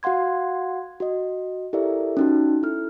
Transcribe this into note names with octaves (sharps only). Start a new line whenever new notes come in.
F#4 F5 F#5 C6 G#6
F#4 D#5
E4 G4 A4 A#4 D5 E5
C#4 D#4 F#4
E4 A4 F6